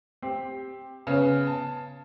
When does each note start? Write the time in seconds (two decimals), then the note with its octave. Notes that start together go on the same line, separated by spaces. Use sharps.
0.22 C4 G4
1.07 C#3 B3 C#4
1.47 A5